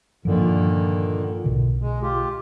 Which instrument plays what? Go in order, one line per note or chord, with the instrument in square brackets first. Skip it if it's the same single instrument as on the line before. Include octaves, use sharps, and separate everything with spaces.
[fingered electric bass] G2 F3 [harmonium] A#2 D3 D#3
[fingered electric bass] B1 B2 D3
[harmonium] G#3
F4 G4